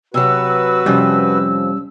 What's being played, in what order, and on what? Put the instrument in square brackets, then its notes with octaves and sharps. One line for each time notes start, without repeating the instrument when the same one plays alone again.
[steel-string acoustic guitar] C3 F#3 [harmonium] F#4 B4 [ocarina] E6
[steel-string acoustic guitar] F2 C3 F3 [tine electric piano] G3 C#4